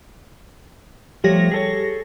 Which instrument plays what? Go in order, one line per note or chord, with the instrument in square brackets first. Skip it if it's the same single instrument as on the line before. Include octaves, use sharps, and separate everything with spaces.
[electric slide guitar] F3 A3 C#5 [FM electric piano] G3 G4 A#6
[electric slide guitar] G#4 A4 C#5